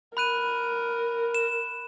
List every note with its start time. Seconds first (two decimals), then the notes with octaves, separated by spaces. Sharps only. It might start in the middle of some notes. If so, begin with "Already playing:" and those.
0.17 A#4 B5 F#6 D#7
1.35 E7